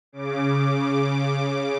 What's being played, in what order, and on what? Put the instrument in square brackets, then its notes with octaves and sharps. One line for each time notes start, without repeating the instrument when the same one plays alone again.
[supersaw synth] C#3 D6